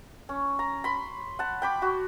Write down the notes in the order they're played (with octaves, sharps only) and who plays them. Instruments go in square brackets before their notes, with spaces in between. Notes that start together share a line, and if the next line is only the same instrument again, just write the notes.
[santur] C#4
A#5
B5 C6
F#5 A5
G5 B5 D6
F#4